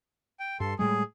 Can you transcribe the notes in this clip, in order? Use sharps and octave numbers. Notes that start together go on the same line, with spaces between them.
G5
G2 A4 C6
A2 G3 G#3 G#4